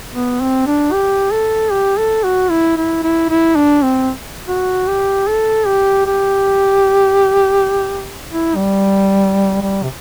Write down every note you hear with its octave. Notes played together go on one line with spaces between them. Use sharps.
B3
C4
D4
G4
A4
G4
A4
F#4
E4
E4
E4
E4
D4
C4
F#4
G4
A4
G4
G4
E4
G3
G3
C3